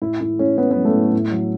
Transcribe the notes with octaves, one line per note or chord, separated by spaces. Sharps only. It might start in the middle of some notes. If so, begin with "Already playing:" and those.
A2 E4
A2 E4
A2 C#4
A2 B3
F#3 B3
A3
A2
A2
F#3